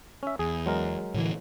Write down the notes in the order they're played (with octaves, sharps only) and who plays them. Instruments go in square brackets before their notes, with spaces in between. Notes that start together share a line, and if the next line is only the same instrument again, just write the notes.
[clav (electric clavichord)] C#4 E5
[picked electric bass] E2 [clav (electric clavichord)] G#4
[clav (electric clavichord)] F#3 G#3 A#4
[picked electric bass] A2 D3 E3